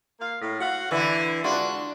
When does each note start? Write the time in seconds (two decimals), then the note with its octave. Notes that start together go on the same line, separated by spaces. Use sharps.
0.20 A#3 F5
0.41 A2
0.60 F#4 F5 F#5
0.91 D3 E3 E4
1.44 G#3 D4 F4 F#4